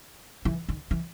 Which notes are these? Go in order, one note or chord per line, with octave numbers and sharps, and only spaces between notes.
E3
D#3
E3